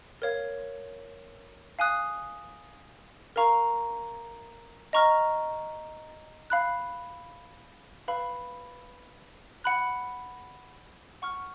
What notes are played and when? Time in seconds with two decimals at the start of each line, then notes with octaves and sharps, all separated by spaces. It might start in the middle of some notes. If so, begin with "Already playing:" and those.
0.22 A#4 C#5 F5
1.79 F5 G#5 D#6 F#6
3.36 A#4 F5 A#5 C#6
4.93 D#5 A#5 C#6 F6
6.50 F5 B5 F#6
8.08 B4 F5 B5
9.64 F#5 B5 F#6
11.22 F#5 C#6 F6